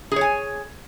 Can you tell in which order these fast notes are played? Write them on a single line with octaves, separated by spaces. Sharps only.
G#4 C#5 G#5